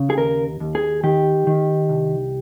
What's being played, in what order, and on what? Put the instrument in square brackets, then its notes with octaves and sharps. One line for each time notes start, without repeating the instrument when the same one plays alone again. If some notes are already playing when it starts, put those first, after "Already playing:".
Already playing: [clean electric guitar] C#3
G#4
D#2 A#4
D#2
G#4
D#3 G4
D#3
C2